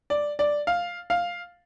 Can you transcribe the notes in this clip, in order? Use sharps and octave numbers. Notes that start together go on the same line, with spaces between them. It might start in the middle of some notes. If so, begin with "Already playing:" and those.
D5
D5
F5
F5